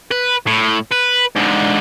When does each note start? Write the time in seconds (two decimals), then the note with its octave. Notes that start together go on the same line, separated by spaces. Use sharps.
0.11 B4
0.47 A2
0.91 B4
1.36 G#2 D3